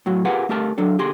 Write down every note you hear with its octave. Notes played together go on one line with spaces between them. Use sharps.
A2 F#3 F#4
F4 G4 G#4 A#4 B4 F#5
A3 G4 A#4 A5
F#3 D4 A4
D3 G4 G#4 C6